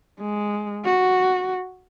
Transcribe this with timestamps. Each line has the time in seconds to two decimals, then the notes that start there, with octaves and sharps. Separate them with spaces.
0.20 G#3
0.85 F#4